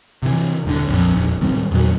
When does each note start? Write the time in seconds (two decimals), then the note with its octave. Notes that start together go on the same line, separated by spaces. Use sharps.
0.23 C3 E3
0.65 D#1 G#2 D3
0.88 A#1 F2
1.14 E1 A#1
1.41 D1 D#3 G3 C4
1.71 E2 A#2 D#3 F#3